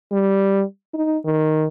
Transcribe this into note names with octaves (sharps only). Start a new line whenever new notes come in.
G3
D#4
D#3